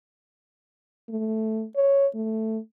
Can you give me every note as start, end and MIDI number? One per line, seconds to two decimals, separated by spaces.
1.10 1.64 57
1.76 2.07 73
2.15 2.58 57